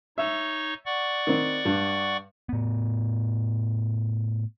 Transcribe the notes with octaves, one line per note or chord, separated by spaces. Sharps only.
D#4 C#5 E5 C#6
D5 F#5 C#6
D#3 C4
G2
A2 B3